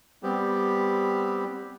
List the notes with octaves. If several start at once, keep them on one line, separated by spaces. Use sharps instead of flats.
G3 B3 C4 G4